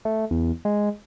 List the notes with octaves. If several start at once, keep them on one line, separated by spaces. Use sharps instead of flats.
A3
E2
G#3